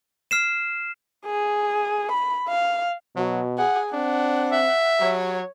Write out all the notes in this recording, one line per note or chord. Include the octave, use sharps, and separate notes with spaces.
F6 C7 E7
G#4
B5
F5
B2 F#3
G#4 F#5
C4 D4 F#5
E5
F#3 G4 C#5